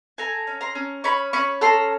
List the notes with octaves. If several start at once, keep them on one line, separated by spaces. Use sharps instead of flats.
A4 G#5 A#5
C#4
A#5 C6
C#4
C#4 B5 C#6
C#4 B5 C#6
A4 A#5 C6